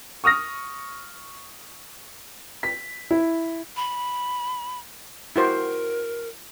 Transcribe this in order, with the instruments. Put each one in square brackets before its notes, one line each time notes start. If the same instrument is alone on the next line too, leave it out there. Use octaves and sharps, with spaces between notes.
[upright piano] C#6 D#6 F6 A#6
[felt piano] B6
E4
[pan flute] B5
[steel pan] E4 F#4 C5 [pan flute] A#4